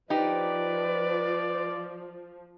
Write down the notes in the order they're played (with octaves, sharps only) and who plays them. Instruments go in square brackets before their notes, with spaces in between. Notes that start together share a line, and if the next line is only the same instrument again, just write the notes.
[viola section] F3 [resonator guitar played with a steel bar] D#4 G4 [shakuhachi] B4 [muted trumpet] D5